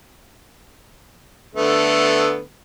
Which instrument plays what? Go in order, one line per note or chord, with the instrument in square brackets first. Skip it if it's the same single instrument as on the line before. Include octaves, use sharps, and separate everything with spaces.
[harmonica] D3 A3 B3